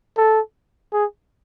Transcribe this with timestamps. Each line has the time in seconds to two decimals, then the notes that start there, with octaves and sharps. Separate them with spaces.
0.17 A4
0.93 G#4